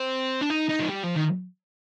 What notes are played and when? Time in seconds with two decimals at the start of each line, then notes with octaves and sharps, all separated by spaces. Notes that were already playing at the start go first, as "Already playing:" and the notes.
Already playing: C4
0.41 D4
0.50 D#4
0.69 D#4
0.80 F3
0.89 G3
1.04 F3
1.16 D#3